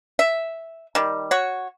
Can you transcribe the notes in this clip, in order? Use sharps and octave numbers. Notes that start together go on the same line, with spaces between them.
E5
D#3 G3
F#4 C#5